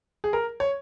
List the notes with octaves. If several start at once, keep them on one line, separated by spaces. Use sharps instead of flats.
G#4
A#4
C#5